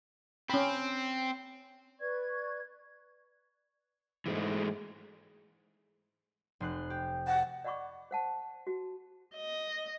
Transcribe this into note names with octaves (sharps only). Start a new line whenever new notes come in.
C4 C#4 B5
B4 D5 C#6 G#6
G#2 E3 G#3 A3
F1 C6 F#6
G4
F#5 A5
D5 D#5 F#5 B5 C#6 D6
C5 F#5 A5
F#4
D#5